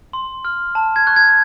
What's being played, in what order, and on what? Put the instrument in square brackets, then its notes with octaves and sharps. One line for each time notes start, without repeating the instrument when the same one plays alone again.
[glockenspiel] C6
F6
A5
G#6
C#6 F#6
G#6